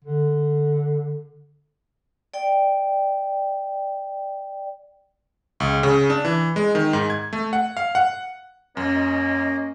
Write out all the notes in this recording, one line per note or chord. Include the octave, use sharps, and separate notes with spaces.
D3
D5 G5
C#2
C#3
D4
E3
G#3
D#3
G#2
G#6
A3
F#5
F5
F#5
F#2 A#3 C#4 D#5